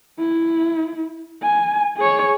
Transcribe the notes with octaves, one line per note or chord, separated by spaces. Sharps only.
E4
G#5
G#4 C#5